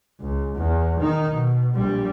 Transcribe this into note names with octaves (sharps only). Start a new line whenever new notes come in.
C#2
E2
D#3 D#4
B2
A#1 G3